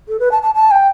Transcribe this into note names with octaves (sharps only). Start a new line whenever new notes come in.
A4
B4
A5
A5
A5
G5